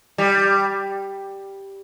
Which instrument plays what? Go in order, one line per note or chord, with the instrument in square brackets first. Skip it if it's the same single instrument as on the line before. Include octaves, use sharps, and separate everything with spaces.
[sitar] G3